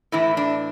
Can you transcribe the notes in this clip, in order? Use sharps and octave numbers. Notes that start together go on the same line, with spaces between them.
A2 E3 E4
D4